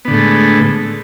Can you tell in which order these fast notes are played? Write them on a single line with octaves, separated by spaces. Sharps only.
B3 D3 A2 A3 G#3